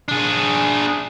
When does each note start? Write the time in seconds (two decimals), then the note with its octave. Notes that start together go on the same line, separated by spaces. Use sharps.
0.08 D4 G#4